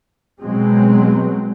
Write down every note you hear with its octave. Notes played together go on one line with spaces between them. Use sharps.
B2 F#3 G#3 C4